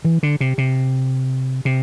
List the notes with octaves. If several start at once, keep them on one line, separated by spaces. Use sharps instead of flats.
E3
D3
C3
C3
C3